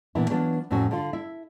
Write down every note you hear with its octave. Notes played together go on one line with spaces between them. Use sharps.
A#2 E3 B3 D4 E4
E3 F#3 B3 D4 F4
F2 A2 F#3 C#4 F#4
D3 F4
E4 E5